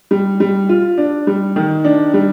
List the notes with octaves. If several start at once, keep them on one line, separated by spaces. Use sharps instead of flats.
G3
G3
F4
D4
G3
D#3
D4
G3